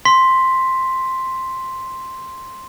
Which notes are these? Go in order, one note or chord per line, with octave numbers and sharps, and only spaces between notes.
C6 B6